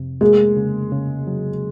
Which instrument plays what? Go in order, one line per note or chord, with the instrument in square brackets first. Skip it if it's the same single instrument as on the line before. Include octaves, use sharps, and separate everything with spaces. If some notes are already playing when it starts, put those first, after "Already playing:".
Already playing: [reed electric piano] F2 C3
[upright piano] G#3 [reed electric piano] A#3
[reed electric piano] C#3
C#3
F#3